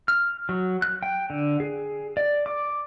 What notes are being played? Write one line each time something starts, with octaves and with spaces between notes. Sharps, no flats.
F6
F#3
F#6
G5
D3
G#4
D5
D6